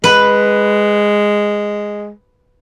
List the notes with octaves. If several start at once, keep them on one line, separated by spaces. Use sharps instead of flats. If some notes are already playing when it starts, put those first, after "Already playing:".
G#3 B4